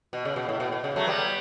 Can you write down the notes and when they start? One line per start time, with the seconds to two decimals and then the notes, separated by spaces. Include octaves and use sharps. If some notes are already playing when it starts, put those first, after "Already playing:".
0.13 B2
0.25 C#3
0.36 B2
0.49 A2
0.60 B2
0.72 B2
0.84 C#3
0.96 F#3 A3
1.07 G3 B3